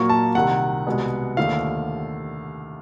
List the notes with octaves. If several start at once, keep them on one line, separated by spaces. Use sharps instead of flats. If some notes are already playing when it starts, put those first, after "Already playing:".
Already playing: A#2 F#3 A#3 C#6
A5
C2 C3 D#3 F#5
C2 B2 G#3 B3
D#2 D3 F3 A3 F5